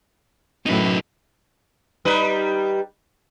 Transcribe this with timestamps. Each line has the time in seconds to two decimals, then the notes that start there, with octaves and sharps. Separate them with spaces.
0.66 F#2 A2 D#4 B4
2.05 G3 D#4 B4